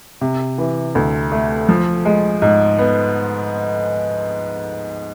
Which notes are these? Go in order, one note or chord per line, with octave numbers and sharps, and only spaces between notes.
C3
E3
D2
A3
F3
G#3
G#2
B3